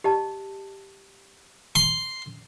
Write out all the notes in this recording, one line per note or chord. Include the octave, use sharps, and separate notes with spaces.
G4 D#5 A5
C6